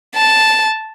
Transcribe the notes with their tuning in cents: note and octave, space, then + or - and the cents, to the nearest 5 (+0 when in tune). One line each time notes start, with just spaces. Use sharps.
A5 -5